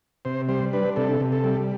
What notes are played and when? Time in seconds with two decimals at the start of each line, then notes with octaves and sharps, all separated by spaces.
0.25 C3 C5
0.49 G3 C5
0.73 D4 B4
0.96 C3 A4
1.20 C3
1.32 A4
1.44 G3